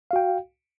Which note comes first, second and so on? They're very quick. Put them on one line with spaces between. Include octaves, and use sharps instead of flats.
F5 F#4 G5